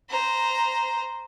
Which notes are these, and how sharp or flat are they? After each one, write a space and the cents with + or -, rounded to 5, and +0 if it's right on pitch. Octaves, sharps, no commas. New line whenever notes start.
C5 -10 A#5 +0